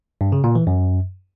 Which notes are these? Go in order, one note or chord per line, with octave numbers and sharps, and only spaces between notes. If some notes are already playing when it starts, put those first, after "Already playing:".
G2
C#3
A#2
E3
F#2